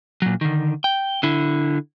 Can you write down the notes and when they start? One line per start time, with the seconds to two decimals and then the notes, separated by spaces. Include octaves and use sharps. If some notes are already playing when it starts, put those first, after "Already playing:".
0.22 A#2 F#3
0.41 D3 D#3
0.84 G5
1.23 D3 E4